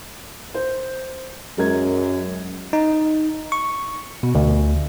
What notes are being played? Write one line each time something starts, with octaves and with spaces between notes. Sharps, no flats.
C5
F#2 G#3 A#4 G#6
D#4
C#6
B2
D2